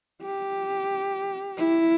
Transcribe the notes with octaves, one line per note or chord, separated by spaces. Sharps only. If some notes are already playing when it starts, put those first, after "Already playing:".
G4
E4